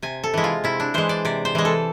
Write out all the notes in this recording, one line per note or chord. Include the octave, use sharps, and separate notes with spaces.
C3 G#5
A4
E3 G#3 E4
F4
C3 E4
D4
E3 G#3 C5
D5
C3 D5
C5
E3 G#3
A4